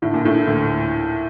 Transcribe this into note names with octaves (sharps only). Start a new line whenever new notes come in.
A2 D3
A#2
A2 A3
D2